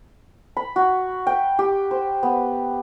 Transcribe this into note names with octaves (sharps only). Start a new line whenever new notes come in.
B5
F#4
G5
G4
C5
B3